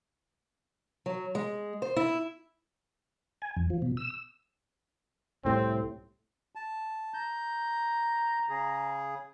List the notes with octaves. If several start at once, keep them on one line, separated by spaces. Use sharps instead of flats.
F#3
G#3
C5
E4
G#5
F2
F3
B2
E6
C2 A2 C3 C4
A5
A#5 G6
C#3 G#4